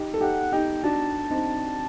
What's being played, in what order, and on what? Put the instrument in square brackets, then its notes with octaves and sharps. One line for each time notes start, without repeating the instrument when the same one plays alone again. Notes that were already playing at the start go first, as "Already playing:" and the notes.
Already playing: [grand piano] D#4 G4
A4
[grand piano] D#4 G4 [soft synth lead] F#5
[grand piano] D#4 G4 [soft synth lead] G5
[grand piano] D4 F#4 [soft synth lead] A5
[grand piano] C4 D#4